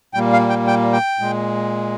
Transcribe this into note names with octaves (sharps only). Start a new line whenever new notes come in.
A#2 G3 A#3 G5
F5
G5
G5
G5
A#2 G#3